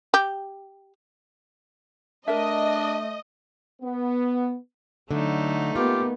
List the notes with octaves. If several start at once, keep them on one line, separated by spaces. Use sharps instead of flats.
G4
A3 D4 A#4 D#5 E5
B3
D3 F#3 A3 D#4
A#3 B3 F4 G4